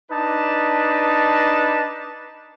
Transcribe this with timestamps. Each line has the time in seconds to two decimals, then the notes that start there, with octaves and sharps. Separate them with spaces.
0.12 D4 D#4 B4 A5